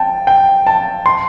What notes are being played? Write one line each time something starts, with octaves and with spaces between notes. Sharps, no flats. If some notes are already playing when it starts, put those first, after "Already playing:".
Already playing: G5 A5
G5
A5
C6